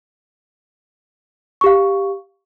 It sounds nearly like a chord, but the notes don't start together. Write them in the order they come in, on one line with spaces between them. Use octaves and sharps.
C#6 G4 F5